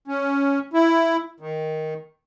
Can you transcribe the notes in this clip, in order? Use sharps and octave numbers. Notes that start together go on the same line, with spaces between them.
C#4
E4
D#3